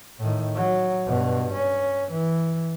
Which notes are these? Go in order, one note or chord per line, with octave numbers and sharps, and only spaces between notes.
A2 D#3
F#3
G2 B2
C#4
E3